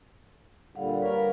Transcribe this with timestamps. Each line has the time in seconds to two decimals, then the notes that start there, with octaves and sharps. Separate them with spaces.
0.76 A#2 D3 G3 F5 F#5
1.02 G3 A#4 B4 C#5 F5